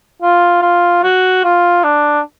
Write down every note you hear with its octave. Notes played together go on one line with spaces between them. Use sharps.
F4
F4
F#4
F4
D4